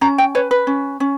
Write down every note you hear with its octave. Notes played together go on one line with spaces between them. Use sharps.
C#4 A#5
G5
B4 C#5
B4
C#4
C#4